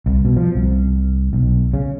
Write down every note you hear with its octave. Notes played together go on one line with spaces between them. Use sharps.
C2
B2
F3
C2
B1
C#3